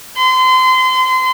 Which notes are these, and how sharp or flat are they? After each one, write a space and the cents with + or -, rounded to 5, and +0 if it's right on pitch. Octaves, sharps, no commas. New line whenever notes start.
C6 -30